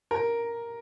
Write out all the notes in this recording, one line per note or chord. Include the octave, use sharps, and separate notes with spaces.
A#4